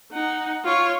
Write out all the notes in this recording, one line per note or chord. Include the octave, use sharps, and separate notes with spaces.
D#4 F#5
F4 C#5